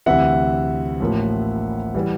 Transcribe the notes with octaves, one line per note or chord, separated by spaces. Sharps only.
D2 C3 E3 E5 F#5
A1 A2 F3 A#3
E3 G3